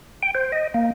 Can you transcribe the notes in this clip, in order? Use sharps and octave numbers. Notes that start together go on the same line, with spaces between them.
G5
C5
D#5
A#3